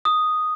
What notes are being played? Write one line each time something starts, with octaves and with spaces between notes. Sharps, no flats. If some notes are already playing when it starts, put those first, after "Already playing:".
D#6